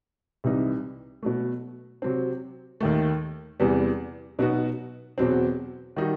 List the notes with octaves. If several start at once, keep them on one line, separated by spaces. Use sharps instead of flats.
C2 C3 E3 G3 D#4
B2 F#3 A3
C3 F#3 C4
D#2 D#3 A3
E2 C3 E3 G3 B3
B2 F#3 B3 D#4 F#4
E2 B2 F#3 C4
D#3 G3 D#4 F#4